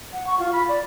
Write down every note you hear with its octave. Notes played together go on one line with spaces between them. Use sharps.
F#5
C#6
F4
B5
D5